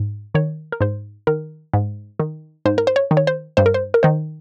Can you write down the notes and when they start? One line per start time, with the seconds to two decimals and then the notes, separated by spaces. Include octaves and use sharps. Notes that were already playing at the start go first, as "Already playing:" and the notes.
Already playing: G#2
0.34 D#3 C#5
0.72 A#4
0.81 G#2 C5
1.27 D#3 A#4
1.74 G#2
2.19 D#3
2.65 G#2 C5
2.78 A#4
2.87 C5
2.96 C#5
3.11 D#3
3.17 C#5
3.27 C5
3.57 G2 C5
3.66 A#4
3.74 C5
3.94 A#4
4.03 D#3 C5